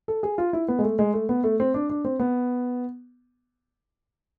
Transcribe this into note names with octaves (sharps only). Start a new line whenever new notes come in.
A4
G#4
F4
E4
B3
G#3
A3
G#3
A3
B3
A3
C4
D4
D4
C4
B3